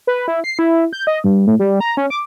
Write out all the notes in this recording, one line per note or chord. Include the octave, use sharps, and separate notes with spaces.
B4
E4
C7
E4
G6
D#5
G2
A2
G3
A#5
C#4
D6